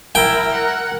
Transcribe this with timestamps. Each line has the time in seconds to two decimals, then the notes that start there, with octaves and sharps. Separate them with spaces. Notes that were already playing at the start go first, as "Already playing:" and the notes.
0.15 E4 A#4 G5
0.51 F#5